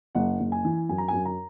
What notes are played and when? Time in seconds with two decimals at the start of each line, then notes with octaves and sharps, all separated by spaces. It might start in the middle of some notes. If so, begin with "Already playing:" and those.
0.15 F#1 F#5
0.40 F#1
0.52 G#5
0.65 E3
0.89 F#2 G#5
0.98 A#5
1.08 F#2 G#5
1.25 A#5